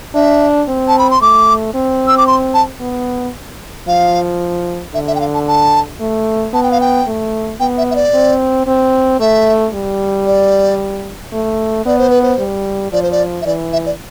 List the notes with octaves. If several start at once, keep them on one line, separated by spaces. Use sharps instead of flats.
D4 E5
C4
A5
B5
C6
A3 D6
C4
E6
D6
C6
A5
B3
F3 F5
D3 E5
E5
G5
F5
A5
A5
A3
B3 A5
G5
F5
G5
A3
B3 G5
E5
E5
D5
C4
C4
A3 E5
G3
D5
A3
B3 D5
C5
B4
C5
G3
F3 D5
C5
D5
E5
E3 D5
E5
D5